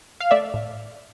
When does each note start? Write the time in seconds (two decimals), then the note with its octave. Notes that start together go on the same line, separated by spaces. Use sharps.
0.20 F5
0.31 A3 D5 E5
0.54 A2